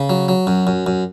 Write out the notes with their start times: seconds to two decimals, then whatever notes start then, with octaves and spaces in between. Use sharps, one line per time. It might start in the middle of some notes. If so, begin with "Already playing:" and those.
Already playing: C#3
0.09 F#3
0.28 F#3
0.47 F#2
0.67 F#2
0.87 F#2